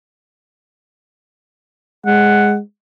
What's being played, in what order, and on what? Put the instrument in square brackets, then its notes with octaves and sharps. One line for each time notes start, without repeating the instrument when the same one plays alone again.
[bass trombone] G#3 [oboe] F#5